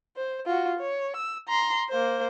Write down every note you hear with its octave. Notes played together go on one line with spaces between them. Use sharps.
C5
F4 F#4
C#5
E6
A#5 C6
A#3 C5